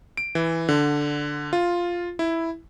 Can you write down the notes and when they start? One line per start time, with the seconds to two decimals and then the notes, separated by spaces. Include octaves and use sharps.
0.17 D7
0.35 E3
0.69 D3
1.53 F4
2.19 E4